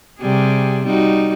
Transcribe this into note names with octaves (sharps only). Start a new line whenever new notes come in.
C3 G3 G#4
G3 D#4 F#4